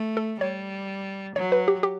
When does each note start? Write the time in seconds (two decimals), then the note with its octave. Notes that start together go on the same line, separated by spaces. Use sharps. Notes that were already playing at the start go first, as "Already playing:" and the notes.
Already playing: A3
0.17 A4
0.41 G3 C#5
1.36 F#3 C#5
1.52 B4
1.68 G4
1.83 G4